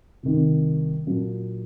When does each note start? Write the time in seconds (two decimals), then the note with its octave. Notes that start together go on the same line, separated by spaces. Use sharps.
0.23 C2 C3 D#3
1.07 A#2 F#3 A#3 D4